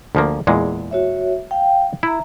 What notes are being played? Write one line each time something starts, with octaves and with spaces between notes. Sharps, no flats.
D2 F3 A#3
E2 A#2 G#3
F#4 C#5 E5
F5 G5
E4 E5 A#5